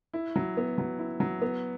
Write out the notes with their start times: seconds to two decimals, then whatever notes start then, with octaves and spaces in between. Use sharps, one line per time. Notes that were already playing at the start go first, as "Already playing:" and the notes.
0.13 E4
0.36 F#3
0.57 B3
0.78 F#3
0.99 E4
1.20 F#3
1.41 B3